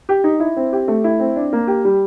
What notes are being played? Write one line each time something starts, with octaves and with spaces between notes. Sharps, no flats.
G4
D#4
E4
C4
G4
A3
E4
C4
D4
A#3
G4
G3